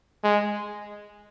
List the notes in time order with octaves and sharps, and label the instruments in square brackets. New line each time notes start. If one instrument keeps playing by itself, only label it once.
[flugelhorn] G#3